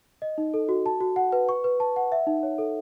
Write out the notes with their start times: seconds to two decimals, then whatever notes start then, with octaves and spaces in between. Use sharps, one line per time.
0.22 D#5
0.38 D#4
0.54 A4
0.69 F#4
0.86 A5
1.01 F#4
1.16 F#5
1.32 B4
1.49 C#6
1.64 B4
1.80 A5
1.96 F#5
2.12 E5
2.27 D#4
2.43 C#5
2.58 A4